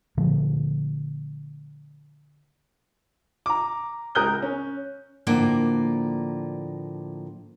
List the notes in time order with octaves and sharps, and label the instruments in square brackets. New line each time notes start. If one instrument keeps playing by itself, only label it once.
[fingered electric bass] A#2 D3 F3 A3
[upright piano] A#5 D6
C#2 A#4 D#6 F#6 G6 G7
C#4
[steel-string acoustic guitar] A2 D3 F3 A#3 D5